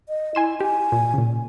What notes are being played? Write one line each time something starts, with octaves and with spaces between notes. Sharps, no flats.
D#5
E4 G#5 C6 E7
G4 G#5
A#2
A#2 C#3